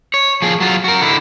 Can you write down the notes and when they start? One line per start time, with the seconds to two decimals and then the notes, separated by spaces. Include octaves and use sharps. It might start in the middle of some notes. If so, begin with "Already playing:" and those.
0.14 C#5
0.42 F3 G#4
0.60 F#3 F4
0.84 F#4 A#4
1.02 D3 E4